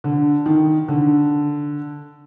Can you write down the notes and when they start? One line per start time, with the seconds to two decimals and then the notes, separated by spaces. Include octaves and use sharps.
0.04 D3
0.46 D#3
0.88 D3